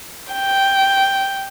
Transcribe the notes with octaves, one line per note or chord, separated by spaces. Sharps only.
G5